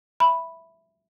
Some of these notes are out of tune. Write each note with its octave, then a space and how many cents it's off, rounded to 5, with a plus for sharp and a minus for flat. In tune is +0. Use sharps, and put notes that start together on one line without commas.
E5 +0 B5 +0